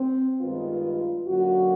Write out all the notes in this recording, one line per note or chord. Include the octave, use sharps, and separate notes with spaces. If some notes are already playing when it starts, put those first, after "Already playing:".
Already playing: C4
G2 D#3 G#3 B3 F4
F#2 D3 F#3 A#3 F#4